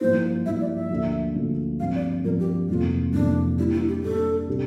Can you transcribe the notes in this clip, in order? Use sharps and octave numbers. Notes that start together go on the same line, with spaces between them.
G2 F3 A#3 E4 C5
G2 F3 A#3 E4 E5
D5
E5
D2 D3 F3 A#3 D4
D2 D3 F3 A#3 D4
G2 F3 C4 F5
D5
G2 F3 C4 A#4
G4
F2 C3 E3 A#3 F4
F2 C3 E3 A#3 D4
A#2 G3 D4 E4
E4
G4
A#2 G3 D4 A4
C3 G3 D4 G4